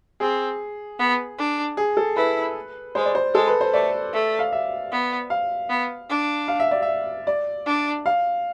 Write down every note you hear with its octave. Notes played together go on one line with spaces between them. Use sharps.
C4 G#4
B3
D4
G#4
A4
E4 B4
G#3 C5
D5
C5
G#3 A4
B4
C5
A3 D5
A3
F5
E5
B3
F5
B3
D4
F5
E5
D5
E5
D5
D4
F5